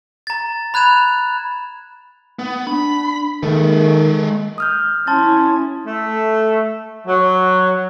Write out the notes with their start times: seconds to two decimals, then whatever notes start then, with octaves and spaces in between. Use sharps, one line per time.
0.27 A#5 A6
0.74 B5 F#6 G#6 E7 F7
2.39 B3
2.67 D4 B5
3.43 D#3 G#3 A4 A#4
4.58 D#6 F6 G6
5.07 C#4 E4 A5 C6 A6
5.86 A3
7.07 F#3